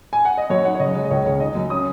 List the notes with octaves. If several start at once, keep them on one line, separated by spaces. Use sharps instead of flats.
G#5
F#5
D#5
F#2 C#5
D#4 F#5
C#5
C#3 D#5
G#3 C#5
D#5
C#2 C#5
C#3 C#5
D#4 D#5
F#2
C#4 D#6